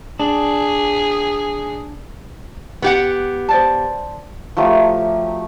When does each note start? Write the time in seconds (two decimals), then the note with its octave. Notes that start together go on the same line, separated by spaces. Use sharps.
0.20 D4 G#4
2.82 B3 G4 F#5
3.49 C5 D5 A5
4.57 F3 F#3 A3 G4